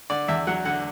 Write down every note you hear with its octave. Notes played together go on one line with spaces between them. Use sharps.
D3 D5
E2 E5
F#3 F#5
D3 F#5